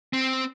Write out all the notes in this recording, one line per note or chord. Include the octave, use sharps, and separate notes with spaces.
C4